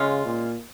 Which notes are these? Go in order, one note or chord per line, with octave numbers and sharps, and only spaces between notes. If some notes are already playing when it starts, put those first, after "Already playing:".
Already playing: C#3 G#3 C#4 F4
A#2